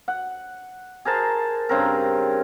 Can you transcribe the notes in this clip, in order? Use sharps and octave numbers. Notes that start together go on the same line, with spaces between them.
F#5
G#4 A#4 C5 A5
G2 C#3 C4 A#4